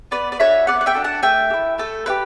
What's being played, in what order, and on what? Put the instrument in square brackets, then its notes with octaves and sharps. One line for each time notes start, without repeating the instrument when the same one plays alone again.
[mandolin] B3 B4 D5
D5
D4 F#4 A4 C#5 E5
B3 D5 F#5
F#5
E5 G5
D4 F#4 A4
F#5 A5
A3 E5 G5
G4
E4
A3 A4
E4 G4 B4